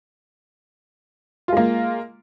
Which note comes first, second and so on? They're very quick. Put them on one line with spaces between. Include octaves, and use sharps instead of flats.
F4 G#3 A#3